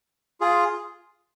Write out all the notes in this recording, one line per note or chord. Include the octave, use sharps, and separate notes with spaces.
F4 G#4